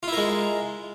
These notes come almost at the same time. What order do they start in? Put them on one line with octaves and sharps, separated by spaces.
F4 E4 A#4 G#3